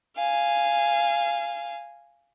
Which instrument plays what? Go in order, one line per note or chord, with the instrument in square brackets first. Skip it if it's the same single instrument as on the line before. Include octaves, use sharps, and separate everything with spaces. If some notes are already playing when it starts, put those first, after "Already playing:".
[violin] F5 G#5